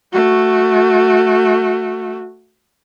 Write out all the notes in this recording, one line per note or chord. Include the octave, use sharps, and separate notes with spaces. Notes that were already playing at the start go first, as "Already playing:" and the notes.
A3 F#4